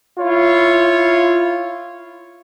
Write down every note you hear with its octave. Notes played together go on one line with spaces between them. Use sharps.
E4 F4 C#5